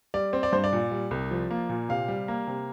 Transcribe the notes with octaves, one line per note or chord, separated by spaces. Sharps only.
G3 D5
C4
D5
G2 C5
D5
A#2
G3
C2
F3
A#3
A#2
C3 F5
G3
A#3
C3